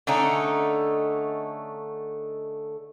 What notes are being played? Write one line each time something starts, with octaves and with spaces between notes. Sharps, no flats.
D3 A3 C#4 D#4